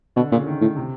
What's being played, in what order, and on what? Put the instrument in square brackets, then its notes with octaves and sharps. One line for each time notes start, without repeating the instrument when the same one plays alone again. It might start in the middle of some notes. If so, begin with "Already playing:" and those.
[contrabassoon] B2 [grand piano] D3
[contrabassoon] A#2 [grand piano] C#3
[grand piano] D#3
[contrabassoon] A2
[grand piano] C3